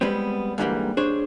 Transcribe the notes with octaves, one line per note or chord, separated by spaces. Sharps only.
G3 G#3 B3 C4
G#2 D3 E3 F#3 G3 A#3
D4 G#4 C5 C#5